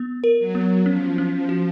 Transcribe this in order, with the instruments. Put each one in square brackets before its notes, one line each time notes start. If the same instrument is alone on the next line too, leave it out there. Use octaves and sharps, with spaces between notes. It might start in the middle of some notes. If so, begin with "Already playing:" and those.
Already playing: [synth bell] B3
A#4
[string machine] F#3
[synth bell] B3
[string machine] F3 [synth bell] C#4
[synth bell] C#4
[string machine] F3
[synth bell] F#4